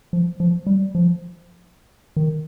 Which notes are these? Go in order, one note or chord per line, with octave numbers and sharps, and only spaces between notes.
F3
F3
G3
F3
D#3